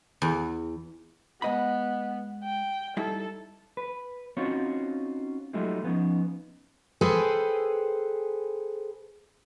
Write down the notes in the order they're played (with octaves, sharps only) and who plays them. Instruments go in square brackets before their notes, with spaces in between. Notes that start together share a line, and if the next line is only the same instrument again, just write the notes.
[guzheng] E2
[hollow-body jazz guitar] G#3 D#5 B5 [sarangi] B3
[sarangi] G5
[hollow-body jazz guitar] G3 D#4 E4 [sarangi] A4
[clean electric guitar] B4
C4 C#4 D#4 F4 F#4 C#5
F#3 G#3 A3 D#4 F4 G4
F3 B3 C#4 D#4
[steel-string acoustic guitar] G#4 A4 B4 C5 G5 G#5